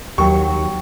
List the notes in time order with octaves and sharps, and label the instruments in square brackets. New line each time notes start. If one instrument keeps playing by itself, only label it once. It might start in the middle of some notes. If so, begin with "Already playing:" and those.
[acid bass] D#2 [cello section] F#3 [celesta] G4 A#4 G5 [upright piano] C#6